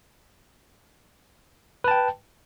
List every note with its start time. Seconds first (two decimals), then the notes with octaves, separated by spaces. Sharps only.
1.84 B4
1.88 A5
1.91 G5